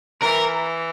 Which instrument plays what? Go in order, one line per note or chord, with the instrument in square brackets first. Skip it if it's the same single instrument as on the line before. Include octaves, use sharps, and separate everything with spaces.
[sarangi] E3 [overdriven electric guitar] A#4